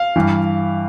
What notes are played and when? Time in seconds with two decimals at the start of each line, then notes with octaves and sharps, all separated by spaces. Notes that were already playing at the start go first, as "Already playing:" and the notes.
Already playing: F5
0.16 G2 E3